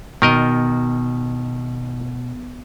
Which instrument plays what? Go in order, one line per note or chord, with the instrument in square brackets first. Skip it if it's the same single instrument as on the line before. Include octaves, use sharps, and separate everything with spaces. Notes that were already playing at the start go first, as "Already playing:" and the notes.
[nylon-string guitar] B2 [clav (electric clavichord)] D#3 A#4 D#5